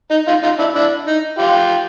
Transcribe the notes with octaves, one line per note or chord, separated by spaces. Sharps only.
D#4
D#4 F4
D#4 F4
D4 E4
D4 E4
D#4
F4 G4